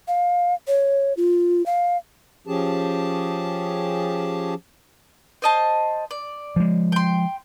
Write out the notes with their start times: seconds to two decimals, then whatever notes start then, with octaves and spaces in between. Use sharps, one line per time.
0.08 F5
0.67 C#5
1.17 F4
1.66 F5
2.47 F3 C#4 G4 G#4 A5
5.42 C5 D#5 A5
6.11 D5
6.56 F3 G#3
6.92 G5 C6